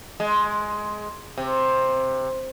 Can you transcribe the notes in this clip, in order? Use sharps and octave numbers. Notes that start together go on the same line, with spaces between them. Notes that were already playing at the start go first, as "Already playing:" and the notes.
G#3
C3